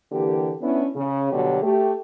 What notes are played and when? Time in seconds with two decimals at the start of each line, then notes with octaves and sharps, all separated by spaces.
0.12 D3 E3 A#3 G4
0.62 B3 C#4 D4 E4
0.96 C#3
1.32 B2 D3 F#3 G3 G4
1.63 A3 G4